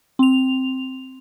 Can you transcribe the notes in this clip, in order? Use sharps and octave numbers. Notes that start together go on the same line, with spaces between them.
C4 F7